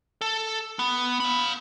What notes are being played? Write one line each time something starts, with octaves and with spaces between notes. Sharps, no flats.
A4
B3
F5 B5